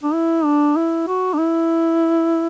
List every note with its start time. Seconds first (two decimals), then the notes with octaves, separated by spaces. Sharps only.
0.03 D4
0.13 E4
0.44 D4
0.77 E4
1.07 F#4
1.34 D4
1.38 E4